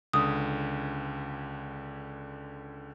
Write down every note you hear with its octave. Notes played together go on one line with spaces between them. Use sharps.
C#2 D3 D#6